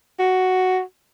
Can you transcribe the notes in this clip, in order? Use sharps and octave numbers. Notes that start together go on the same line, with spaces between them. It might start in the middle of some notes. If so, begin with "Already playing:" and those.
F#4